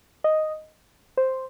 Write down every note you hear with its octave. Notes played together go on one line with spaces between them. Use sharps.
D#5
C5